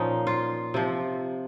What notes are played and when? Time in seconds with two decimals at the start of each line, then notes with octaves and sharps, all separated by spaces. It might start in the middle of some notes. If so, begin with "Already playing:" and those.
Already playing: A#2 F3 C#4 D#4
0.27 F4
0.74 C3 F3